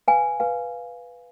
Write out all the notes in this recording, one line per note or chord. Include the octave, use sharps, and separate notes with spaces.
B4 F5 G#5
B4 F5 G#5